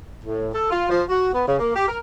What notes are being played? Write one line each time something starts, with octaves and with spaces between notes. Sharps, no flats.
A2
A4
F4
F3
F#4
B3
C#3
A#3
G4
A#4